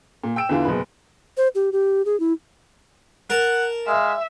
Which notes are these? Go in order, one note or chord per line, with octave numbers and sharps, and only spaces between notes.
A#2
G5 E6 D7 E7
E2 D3 E3 F4
F#1 B2 B4
C5
G4
G4
G#4
E4
A#4 F#5 A5
G#3 E5 F5